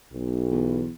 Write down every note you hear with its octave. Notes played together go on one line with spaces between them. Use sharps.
B1
E2